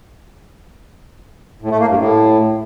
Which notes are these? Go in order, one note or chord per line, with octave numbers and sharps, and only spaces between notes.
A2
A3
A#3
G2
A2